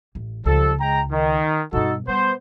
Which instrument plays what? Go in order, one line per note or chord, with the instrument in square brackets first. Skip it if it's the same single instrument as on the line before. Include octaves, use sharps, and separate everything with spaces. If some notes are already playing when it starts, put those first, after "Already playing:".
[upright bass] A1
[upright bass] C#2 [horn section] F3 G3 A4
[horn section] G#3 G5 A#5
D#3
[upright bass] G2 B2 [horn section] D#4 F#4 A4
[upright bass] G3 [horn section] B3 C5